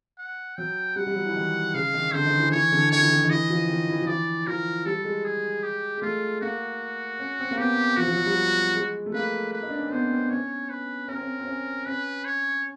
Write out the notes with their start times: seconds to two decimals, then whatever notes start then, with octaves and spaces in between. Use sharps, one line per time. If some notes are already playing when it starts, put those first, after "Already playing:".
0.18 F#5
0.57 F#3 G5
0.96 G3 F#5
1.07 G3
1.15 F#3
1.25 E3
1.36 D#3
1.74 C#3 F5
1.94 D#3
2.13 D3 C5
2.26 D#3
2.39 E3
2.52 E3 C#5
2.72 D3
2.92 D#3 C#5
3.01 E3
3.09 D#3
3.24 D#3
3.30 E3 D#5
3.50 F3
3.68 D#3
3.89 E3
4.02 F3
4.07 E3 D5
4.47 F3 A#4
4.86 G3 A4
5.05 G#3
5.25 G#4
5.64 G4
5.97 G#3
6.02 A3 F4
6.41 A#3 F#4
7.19 C#4
7.39 C4
7.51 A#3
7.58 B3 G4
7.97 F3 F#4
8.08 F3
8.17 F#3
8.26 G3
8.75 G#3
9.06 A3
9.14 A#3 B4
9.53 B4
9.62 D#4
9.70 D4
9.77 C#4
9.85 C4
9.92 B3 C5
10.12 C4
10.30 C#4 C#5
10.70 B4
11.08 C#4 A#4
11.16 C4
11.22 C#4
11.39 C4
11.47 C#4
11.86 C#4 B4
12.25 C#5